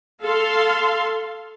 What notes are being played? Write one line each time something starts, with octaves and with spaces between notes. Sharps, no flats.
A4 F5 C6